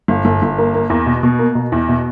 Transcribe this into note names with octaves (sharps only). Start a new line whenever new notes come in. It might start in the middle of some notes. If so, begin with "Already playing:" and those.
G1
G1
G1
A#3
A#3
E2
B2
B2
A#3
B2
E2
B2